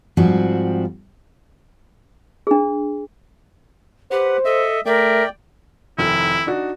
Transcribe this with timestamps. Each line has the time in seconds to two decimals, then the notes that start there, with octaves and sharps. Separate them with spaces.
0.17 G#2 F3 G3 C4 F#4
2.47 D4 G#4
4.11 G4 B4 C5 F#5
4.45 A4 D#5 E5
4.86 A3 A#4 D5 E5 G5
5.99 F1 D#3 E4
6.47 D4 D#4 F#4